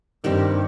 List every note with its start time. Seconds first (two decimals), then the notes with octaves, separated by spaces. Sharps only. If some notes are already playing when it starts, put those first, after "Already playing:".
0.24 G2 D#3 G3 C4 G4